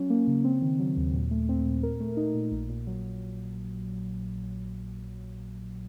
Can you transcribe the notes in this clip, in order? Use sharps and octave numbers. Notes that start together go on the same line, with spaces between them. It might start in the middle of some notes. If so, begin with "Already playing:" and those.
Already playing: F#3 C#4
A#3
C#3
C4
D#3
F#3
D#2
A#2
A3
C4
A#2
A#4
A3
D#4
A#2
A#1
A#2
F#3